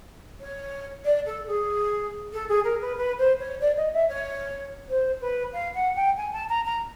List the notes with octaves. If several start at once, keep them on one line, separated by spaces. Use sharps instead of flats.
C#5
D5
A4
G#4
A4
G#4
A#4
B4
B4
C5
C#5
D5
D#5
E5
C#5
C5
B4
F5
F#5
G5
G#5
A5
A#5
A#5